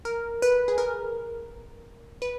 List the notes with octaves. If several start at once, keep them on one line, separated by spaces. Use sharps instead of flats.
A#4
B4
G#4
A#4
B4